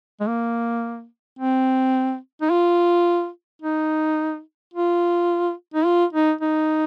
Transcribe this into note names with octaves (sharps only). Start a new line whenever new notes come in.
G#3
A#3
C4
D#4
F4
D#4
F4
D#4
F4
D#4
D#4